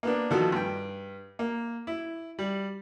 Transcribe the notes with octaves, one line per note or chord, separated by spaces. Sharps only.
A#3 B3 D4
B2 D#3 F3 D#4 F#4 A4
G2 G5
A#3
E4
G3